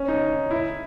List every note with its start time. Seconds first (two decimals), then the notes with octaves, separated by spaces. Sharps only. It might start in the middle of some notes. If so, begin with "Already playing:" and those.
Already playing: C#4
0.08 D#4
0.51 E4